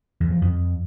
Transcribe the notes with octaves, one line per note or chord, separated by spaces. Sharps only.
E2
F3
F2